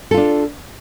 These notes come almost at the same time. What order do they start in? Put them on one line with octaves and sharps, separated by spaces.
A4 F4 D4